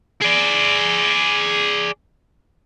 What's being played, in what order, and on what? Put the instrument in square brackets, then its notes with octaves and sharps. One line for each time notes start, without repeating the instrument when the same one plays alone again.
[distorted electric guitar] G#4 D5